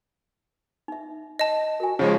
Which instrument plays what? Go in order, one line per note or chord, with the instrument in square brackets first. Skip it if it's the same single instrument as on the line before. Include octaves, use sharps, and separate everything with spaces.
[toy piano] D#4 E5
[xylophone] D#5 A5
[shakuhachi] F#4 [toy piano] A#4 G#5
[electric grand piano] C#3 F3 G#3 [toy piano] C#4 D#4 [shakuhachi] C#5